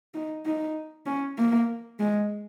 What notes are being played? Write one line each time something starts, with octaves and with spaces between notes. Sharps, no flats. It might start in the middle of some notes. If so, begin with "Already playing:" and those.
D#4
D#4
C#4
A#3
G#3